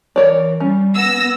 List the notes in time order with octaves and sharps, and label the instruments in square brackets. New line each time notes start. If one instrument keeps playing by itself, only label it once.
[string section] E3 [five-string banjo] A#4 C#5 D5
[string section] G3 [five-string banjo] C#4
[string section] B3 E6 A#6